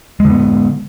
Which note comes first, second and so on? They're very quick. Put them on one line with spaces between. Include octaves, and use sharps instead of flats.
G#3 D3 B3